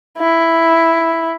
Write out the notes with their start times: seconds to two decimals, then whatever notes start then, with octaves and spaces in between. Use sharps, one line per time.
0.18 E4